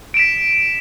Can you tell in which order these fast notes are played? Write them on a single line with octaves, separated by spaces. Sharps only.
D7 E7 B6